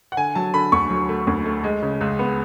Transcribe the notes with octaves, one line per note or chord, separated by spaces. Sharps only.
F#5
D3 G#5
F#3 A5
D3 B5
D2 C#6
F#3
A3
D2
A3
G#3
C#3
C#2
B3